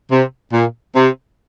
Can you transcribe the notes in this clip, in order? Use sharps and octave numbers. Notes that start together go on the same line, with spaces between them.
C3
A#2
C3